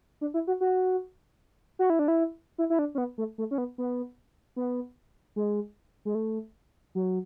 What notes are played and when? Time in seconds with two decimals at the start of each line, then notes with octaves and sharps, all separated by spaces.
0.21 D4
0.34 E4
0.47 F#4
0.61 F#4
1.79 F#4
1.90 E4
1.99 D4
2.08 E4
2.58 E4
2.70 E4
2.79 D4
2.95 C#4
2.98 B3
3.18 A3
3.38 A3
3.51 C#4
3.58 B3
3.78 B3
4.56 B3
5.36 G#3
6.05 G#3
6.15 A3
6.95 F#3